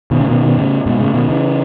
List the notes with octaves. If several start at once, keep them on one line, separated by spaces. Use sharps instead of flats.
B2 D#3
A2 C#3
B2 D#3
B2 D#3
A2 C#3
G#2 B2
A2 C#3
B2 D#3
C#3 E3